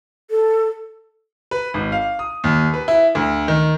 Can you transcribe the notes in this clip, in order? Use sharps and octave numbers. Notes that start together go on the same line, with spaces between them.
A4
B4
G#1
F5
D#6
D#2
B4
E4
D2
D#3